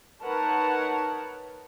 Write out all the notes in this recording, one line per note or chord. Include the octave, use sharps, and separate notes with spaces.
D#4 A#4 B4 C#5 F#5 A5